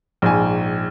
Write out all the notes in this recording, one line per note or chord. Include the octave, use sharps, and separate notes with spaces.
A#1 G#2 G#5